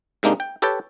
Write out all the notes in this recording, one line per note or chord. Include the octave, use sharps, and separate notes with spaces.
G#2 C3 G#3 A#3 D4 D#4
G5
G4 A4 B4 C#5 G5 A5